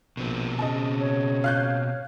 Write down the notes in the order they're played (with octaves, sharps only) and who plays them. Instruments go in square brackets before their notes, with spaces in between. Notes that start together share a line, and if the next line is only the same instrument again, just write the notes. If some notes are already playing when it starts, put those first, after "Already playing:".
[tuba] A#1 [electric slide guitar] B2 C4
[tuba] C#3 [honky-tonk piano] D#5 A5
[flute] C#5
[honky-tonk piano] F5 F#6 G6